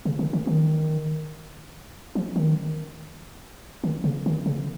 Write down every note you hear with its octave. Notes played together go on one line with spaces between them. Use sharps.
C#3
D#3
D#3
D#3
F3
D#3
D#3
C#3
D#3
C#3